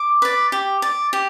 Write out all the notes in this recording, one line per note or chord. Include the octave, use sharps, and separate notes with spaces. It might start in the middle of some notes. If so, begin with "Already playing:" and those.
Already playing: D6
B4 D5
G4
D5
G4